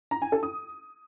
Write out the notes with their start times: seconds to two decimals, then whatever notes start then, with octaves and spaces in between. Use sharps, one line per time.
0.11 A#5
0.22 G#5
0.32 A4
0.43 D#6